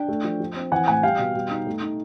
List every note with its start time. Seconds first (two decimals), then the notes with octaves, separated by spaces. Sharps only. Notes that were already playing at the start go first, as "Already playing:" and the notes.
Already playing: D4 G5
0.09 A3
0.24 F3
0.40 F3
0.56 C4
0.72 E3 F#5 G#5
0.87 A2 F#5 G#5
1.03 G3 F5 G5
1.19 B2
1.35 G3
1.51 D#4
1.67 A3
1.82 D#4